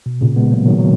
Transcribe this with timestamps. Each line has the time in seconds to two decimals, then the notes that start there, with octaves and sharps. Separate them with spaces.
0.06 B2
0.21 A#2 C#3
0.36 G#3 B3
0.52 F#3 A#3
0.67 D#3 F#3
0.79 F#3